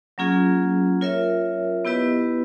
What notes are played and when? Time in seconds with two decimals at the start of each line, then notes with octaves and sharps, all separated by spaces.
0.18 F#3 A#3 C#4 F4 G#4
1.01 F4 A#4 C#5 E5
1.85 B3 E4 G4 B4 D#5